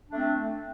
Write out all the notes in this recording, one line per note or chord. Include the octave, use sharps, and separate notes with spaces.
A3 C4 D4